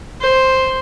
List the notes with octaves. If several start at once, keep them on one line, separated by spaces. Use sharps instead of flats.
C5